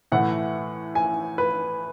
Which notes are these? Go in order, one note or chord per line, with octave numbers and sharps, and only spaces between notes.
A2 E3 A3 F#5
G#5
B4